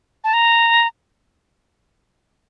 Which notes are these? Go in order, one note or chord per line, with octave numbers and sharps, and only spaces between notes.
A5
A#5